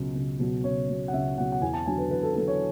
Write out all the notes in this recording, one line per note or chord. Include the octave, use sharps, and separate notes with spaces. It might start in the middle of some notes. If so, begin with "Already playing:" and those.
Already playing: C#2 B2 F#3
C#2
B2 F#3
C#2 C#5
B2 F#3
F#5
C#2 E5
B2 F#3 F#5
F#5
E2 G#5
A5
D3 F#3 G#5
B4
E2 B4
A4
D3 F#3 A4
C#5